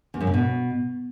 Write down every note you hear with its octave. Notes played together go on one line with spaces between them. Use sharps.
E2
F#2
C#3
B2